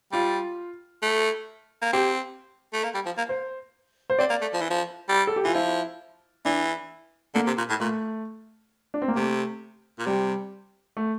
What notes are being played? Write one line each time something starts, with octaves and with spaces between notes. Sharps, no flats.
G3 F4
A3
A#3
C4 G4
A3
A#3
G3
F3
A#3
C5
C5
C4 D5
A#3
A3
F3
E3
F3
G3
A4
G4
E3 F4
F3 E4
E3 D4
D3 A#3
C3
A#2
A2
A#2 A3
D4
C4
A#3
C3 A3
A#2
C3 G3
A3